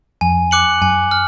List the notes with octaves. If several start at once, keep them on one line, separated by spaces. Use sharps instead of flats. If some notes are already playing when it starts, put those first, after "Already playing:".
F2 G#5
D6 F#6 C#7 F#7
F#2 G#5
F6